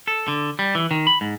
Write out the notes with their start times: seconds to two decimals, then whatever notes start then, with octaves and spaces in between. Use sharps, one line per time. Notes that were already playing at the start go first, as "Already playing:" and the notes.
0.07 A4
0.28 D3
0.59 G3
0.75 E3
0.91 D#3
1.07 B5
1.21 G#2